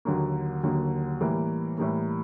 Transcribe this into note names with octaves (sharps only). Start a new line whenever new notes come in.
D#2 D3 F#3 A#3
D#2 D3 F#3 A#3
A2 E3 G3 A#3
A2 E3 G3 A#3